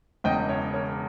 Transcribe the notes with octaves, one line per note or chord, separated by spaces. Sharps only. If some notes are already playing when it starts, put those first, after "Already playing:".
E1 E2 C#3 D#5 G5
C#5 E5
A#4 C#5